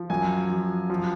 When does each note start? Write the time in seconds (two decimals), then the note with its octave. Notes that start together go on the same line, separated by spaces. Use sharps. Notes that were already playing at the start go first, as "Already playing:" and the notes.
Already playing: F3
0.10 F#2 G#5
0.50 F3
0.90 F3